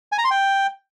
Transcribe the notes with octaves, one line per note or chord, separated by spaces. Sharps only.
G#5
A#5
C6
G5